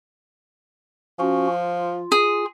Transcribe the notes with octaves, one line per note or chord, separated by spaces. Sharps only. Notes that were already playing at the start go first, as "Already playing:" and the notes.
F3 C#4 F#4
F4
G#4